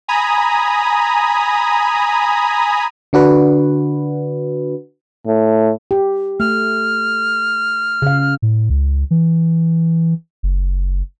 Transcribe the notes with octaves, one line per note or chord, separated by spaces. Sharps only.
G#5 A#5 B5 D#6
D3 D4 F#4 B4
A2
G4
A3 F6
C#3 F5
A2
C#2
E3
F#1